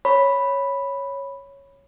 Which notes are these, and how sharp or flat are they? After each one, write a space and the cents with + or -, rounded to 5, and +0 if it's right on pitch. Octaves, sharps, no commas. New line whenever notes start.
C#5 +0 B5 +0